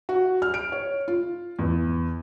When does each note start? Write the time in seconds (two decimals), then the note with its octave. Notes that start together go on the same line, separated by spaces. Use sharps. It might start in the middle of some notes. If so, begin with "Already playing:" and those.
0.09 F#4
0.42 F6
0.54 D7
0.72 C#5
1.08 F4
1.59 E2